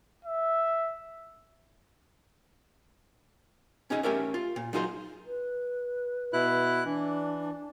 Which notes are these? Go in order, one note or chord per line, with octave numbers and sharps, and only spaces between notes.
E5
C#4 D#4 G#4 D#5
A3 C#4 G4 A#4 C#5 E5
F4
A#2
F#3 D#4 F4 G#4 A4 C5
B4
B2 E4 F#6
E3 D4